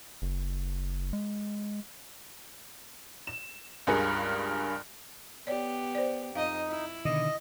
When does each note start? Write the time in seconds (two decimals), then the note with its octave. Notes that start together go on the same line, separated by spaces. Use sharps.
0.22 F#1
1.13 G#3
3.27 E7
3.87 C#2 G2 G#4 A#4 F#6 C#7
5.47 B3 G4 C#5 D5
5.95 C5 D5
6.35 F2 D#4 D#5 F5
6.69 E4
7.05 B2 D3 D#3 D#5